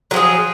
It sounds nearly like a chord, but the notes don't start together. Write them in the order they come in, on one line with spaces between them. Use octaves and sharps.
F#3 F3 G#4